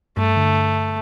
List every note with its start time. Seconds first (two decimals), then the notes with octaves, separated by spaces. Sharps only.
0.17 G2 A3
0.36 D3